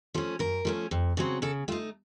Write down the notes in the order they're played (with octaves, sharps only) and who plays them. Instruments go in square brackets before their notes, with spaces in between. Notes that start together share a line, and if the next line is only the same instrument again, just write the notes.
[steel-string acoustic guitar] F3 A3 C#4
F#2 A#4
F3 A3 C#4
F2
C#3 F#3 C4
C#3 A4
A3 F4
D#4